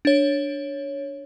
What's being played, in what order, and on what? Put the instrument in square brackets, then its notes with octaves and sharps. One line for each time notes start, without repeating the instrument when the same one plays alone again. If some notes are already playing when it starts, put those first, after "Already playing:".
[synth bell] D4 C#5